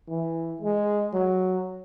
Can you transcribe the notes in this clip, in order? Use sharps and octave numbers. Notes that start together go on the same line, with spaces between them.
E3
G#3
F#3